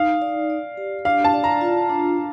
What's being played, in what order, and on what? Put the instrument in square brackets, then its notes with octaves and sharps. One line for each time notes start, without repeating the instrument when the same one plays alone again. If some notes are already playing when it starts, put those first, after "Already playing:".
Already playing: [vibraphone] D#4 [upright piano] F5
[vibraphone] D5
D5
G4
[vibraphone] D4 [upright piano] F5
[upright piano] A5
[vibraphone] D5
[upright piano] A#5
[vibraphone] F4
D4